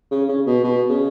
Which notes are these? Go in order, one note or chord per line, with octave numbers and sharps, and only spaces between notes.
C#3
C#3
B2
B2
C#3